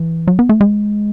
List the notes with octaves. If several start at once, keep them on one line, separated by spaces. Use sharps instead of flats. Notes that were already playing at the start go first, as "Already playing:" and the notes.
Already playing: E3
F#3
B3
A3
G#3